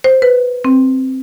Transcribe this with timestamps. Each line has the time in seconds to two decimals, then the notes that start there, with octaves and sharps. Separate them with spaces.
0.04 C5
0.22 B4
0.65 C4